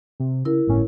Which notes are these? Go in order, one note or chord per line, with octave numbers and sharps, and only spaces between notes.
C3
C#3 E4 A#4
G1 A2 C#4